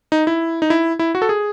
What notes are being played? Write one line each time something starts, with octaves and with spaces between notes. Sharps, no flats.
D#4
E4
D#4
E4
E4
F#4
A4
G#4